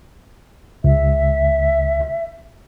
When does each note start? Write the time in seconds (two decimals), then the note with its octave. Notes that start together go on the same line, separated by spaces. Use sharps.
0.84 C#2 E5